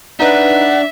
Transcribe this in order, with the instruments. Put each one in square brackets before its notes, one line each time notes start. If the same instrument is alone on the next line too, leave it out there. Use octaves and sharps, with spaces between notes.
[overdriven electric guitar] D4 [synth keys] D#4 B4 D#5 [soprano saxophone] E5 [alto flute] F#5